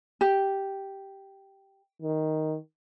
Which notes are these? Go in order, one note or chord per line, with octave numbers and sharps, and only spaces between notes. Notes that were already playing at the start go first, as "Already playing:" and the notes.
G4
D#3